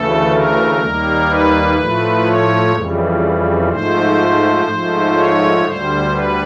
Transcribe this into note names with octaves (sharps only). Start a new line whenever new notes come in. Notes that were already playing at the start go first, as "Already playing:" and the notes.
Already playing: D2 C#3 E3 A3 A4
A#4
D#2 D#3 G3 A#3
B4
A2 F3 A3
C#5
F2 C#3 E3 G3
G#2 F3 A3 C5
G#2 F3 A3
C#5
D2 D3 G3 C5
B4